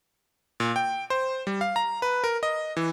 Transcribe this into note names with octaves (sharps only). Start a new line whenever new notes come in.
A#2
G5
C5
G3
F5
A#5
B4
A#4
D#5
E3